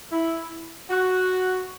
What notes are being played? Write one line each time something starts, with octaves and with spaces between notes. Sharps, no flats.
E4
F#4